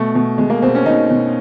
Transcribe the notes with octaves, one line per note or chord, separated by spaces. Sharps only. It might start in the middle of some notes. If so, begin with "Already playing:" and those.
Already playing: B2 A3
B2
B2 G#3
A#3
B2 C4
C#4
B2 D#4
B2